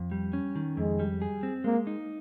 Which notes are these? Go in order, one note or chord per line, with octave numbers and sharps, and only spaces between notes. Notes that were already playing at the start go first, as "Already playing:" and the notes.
Already playing: F2
G3
C#4
D#3
F2 G#3
G3
G#4
C4
G#3 A#3
D#4